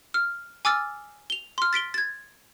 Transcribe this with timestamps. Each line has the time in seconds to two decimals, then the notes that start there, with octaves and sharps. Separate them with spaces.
0.14 F6
0.65 G#5 D6 E6 F6 A6
1.30 F7 G7
1.58 C6 F6
1.73 A6 B6 D7 G7
1.94 G#6 A6